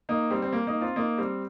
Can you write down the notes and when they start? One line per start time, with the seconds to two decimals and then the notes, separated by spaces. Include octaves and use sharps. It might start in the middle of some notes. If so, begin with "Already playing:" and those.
0.09 A#3 D#4
0.30 G3 C4
0.42 C4
0.53 A#3
0.67 A#3 D#4
0.81 C4 F4
0.96 A#3 D#4
1.18 G3 C4